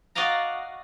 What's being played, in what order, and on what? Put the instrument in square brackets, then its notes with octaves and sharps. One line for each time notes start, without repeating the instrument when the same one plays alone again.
[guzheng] F#4 D5 D#5 F5 A#5